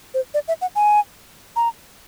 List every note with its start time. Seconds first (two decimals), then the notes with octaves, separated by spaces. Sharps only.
0.14 C5
0.34 D5
0.48 E5
0.61 F#5
0.75 G#5
1.56 A#5